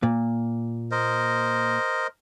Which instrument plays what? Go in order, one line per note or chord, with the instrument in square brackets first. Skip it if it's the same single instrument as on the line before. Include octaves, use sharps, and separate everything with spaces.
[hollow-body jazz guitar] A#2
[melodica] A#4 C5 D#5